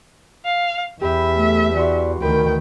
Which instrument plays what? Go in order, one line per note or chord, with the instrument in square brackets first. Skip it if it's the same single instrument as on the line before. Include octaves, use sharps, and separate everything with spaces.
[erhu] F5
[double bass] E2 [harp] G4 B5 [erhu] E5
[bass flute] A3
[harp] E3 F#4 C6 [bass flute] D5
[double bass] D2 D#3 [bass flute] A#4 [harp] B4 [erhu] G5